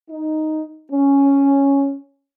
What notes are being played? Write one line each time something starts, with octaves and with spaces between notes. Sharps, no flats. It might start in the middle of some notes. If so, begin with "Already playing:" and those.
D#4
C#4